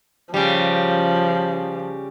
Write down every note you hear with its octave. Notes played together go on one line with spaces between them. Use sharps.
C#3 F3 G3